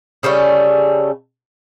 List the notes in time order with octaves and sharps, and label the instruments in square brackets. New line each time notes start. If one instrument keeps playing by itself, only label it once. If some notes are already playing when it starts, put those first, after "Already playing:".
[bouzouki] C#3 G3 A3 C#4